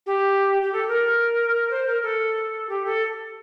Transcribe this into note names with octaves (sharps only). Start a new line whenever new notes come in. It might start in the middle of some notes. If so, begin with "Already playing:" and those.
G4
G4
A4
A#4
C5
A#4
A4
G4
A4